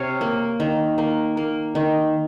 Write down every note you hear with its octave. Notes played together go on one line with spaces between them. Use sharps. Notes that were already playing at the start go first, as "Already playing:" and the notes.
Already playing: C3 C#5 F5
A#3
D#3
A#3
A#3
D#3